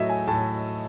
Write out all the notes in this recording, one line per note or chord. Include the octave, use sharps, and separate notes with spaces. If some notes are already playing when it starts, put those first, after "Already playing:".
Already playing: A2 F#3 D#5 E5
G#5
A2 A5